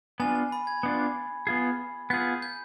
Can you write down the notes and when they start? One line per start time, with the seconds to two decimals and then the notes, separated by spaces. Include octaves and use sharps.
0.20 B3 D4 F4 G#5
0.35 G#5
0.52 B5
0.67 G#6
0.83 B3 D4 F4
1.47 B3 F4 G#4
2.10 B3 F4 G#4 G6
2.42 G6